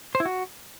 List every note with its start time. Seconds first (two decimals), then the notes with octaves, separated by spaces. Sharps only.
0.15 C5
0.20 E4
0.25 F#4